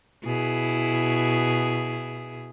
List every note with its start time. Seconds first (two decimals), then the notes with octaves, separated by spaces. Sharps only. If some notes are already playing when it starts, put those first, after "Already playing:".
0.25 B2 E4 G#4